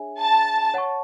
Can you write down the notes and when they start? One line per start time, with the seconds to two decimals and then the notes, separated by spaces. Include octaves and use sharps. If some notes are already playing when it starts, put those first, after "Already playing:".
Already playing: D4 G#4 C#5 E5 G#5
0.19 A5
0.74 C#5 F#5 A5 C#6